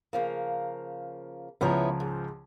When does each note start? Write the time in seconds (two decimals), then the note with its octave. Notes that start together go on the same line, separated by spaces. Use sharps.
0.13 C#3 F3 A#3
1.61 C#2 F3 B3 E4 C#5 A#5
2.00 G#2